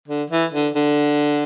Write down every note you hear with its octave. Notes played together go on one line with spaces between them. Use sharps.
D3
E3
D3
D3